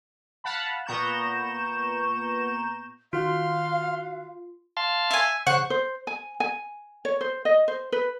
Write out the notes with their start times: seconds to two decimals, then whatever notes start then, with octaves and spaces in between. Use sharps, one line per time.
0.44 F5 F#5 A5 B5
0.86 A#2 B3 A#5 C#6 G6 E7
3.13 D#3 F4 F#4 F5 C6 F6 F#6
4.77 F5 A5 C6
5.11 E5 G#5
5.47 C#3 C5 F#5 C#6
5.70 C5
6.07 G#5
6.40 G#5
7.05 C#5
7.21 C5
7.45 D#5
7.68 C5
7.92 B4